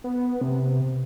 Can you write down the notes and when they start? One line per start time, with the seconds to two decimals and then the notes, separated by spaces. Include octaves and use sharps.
0.04 B3
0.41 C3